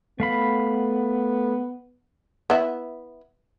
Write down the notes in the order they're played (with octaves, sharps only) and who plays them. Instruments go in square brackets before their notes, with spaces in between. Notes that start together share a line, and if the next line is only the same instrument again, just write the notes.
[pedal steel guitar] A3 F5 B5 [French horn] B3
[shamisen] B3 E4